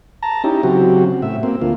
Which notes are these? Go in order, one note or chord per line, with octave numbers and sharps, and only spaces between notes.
A5 A#5
C#4 D#4 E4 G4
C#3 F#3 C4 F#4 G4
A2 E5
A#3 C4
D2 A#3 F4